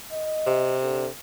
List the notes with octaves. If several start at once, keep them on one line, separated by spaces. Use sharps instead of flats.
D#5
C3
D3